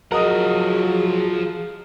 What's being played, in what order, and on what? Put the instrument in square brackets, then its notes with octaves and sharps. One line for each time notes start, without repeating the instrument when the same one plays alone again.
[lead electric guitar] F3 F#5 [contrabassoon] F#3 [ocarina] G#4 [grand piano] A#4 D#5 D#6